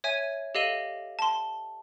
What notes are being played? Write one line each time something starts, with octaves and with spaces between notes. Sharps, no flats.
C#5 E5 G#5 G#6 D#7
G4 A4 D#5 F5 D#7 G7
A5 C6